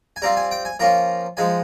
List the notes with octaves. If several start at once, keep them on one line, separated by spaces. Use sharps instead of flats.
G#5
G3 C4 F4 A#5
G#5
G5
G#5
F3 A#3 C#4 F4 A#5
F3 G#3 D#4 G#5